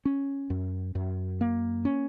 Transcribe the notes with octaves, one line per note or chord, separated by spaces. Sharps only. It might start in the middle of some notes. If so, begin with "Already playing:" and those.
C#4
F#2
F#2
A#3
C#4